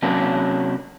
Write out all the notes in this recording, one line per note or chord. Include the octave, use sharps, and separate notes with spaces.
C3 F#3 A#3 C#4 D4